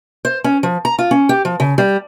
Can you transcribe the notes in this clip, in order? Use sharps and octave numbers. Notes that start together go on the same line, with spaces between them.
C5
C#4
F3
A#5
F4
C#4
G4
F3
C#3
G3